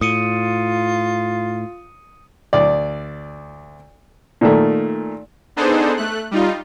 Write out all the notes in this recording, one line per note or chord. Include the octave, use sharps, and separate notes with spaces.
A2 F4 D#6 C#7 D#7
D2 D5
A#2 D#3 A3
B3 D4 D#4 G#4 A4 C5
A3 F#6
G3 D#4 F4